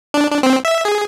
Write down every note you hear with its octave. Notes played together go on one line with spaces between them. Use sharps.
D4
D4
C4
E5
G#4